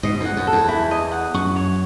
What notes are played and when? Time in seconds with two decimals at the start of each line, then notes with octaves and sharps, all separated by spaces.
0.03 G#2 B2 D#5
0.20 E2
0.25 F#5
0.37 F#2
0.47 A4
0.52 E2
0.68 E4
0.91 D#5
1.12 F#5
1.34 F#2 C#6
1.56 C#5